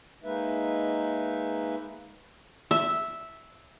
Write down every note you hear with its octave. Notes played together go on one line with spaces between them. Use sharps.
G#3 A#3 D#4 B4 E5
E5